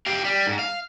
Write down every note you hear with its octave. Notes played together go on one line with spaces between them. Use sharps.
G4 F5
G3
G#2
F5